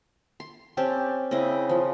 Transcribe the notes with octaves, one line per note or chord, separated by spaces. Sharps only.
C6
C4 C#4 G4 A5
C#3 C4 E4 D#5
F3